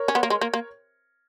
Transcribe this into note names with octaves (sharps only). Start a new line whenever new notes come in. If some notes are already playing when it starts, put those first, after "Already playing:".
Already playing: A#4 C#5
C#4
B3
A#3
G#3
A#3
A#3